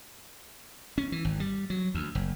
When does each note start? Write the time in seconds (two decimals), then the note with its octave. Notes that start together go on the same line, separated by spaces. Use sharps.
0.98 C#4
1.12 E3
1.25 G#1
1.40 G3
1.70 F#3
1.95 D2
2.15 F#1